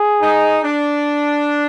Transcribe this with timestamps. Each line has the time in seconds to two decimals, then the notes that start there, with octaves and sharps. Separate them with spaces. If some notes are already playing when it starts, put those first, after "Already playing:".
Already playing: G#4
0.21 D#4
0.63 D4